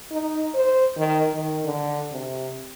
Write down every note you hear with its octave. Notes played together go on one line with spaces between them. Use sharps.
D#4
C5
D#3
D#3
D3
C3